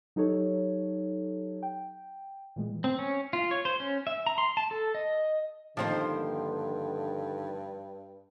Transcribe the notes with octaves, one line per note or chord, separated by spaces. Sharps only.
F#3 D#4 G4 A4 C#5
G5
A#2 E3 G#3
C4
C#4
F4
C#5
C5
C#4
E5
A#5
C6
A5
A4
D#5
G2 D3 D#3 F3 A#3 C4 C5